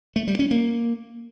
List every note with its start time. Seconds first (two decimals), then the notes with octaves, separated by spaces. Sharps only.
0.16 A3
0.27 G3
0.39 C#4
0.51 A#3